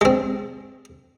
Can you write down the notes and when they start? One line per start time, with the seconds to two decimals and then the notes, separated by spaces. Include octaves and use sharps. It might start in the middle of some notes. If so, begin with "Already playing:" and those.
0.01 G#3 C4